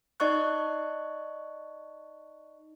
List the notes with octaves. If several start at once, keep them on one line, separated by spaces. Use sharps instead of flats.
D#4 D5 D#5 C#6 F#6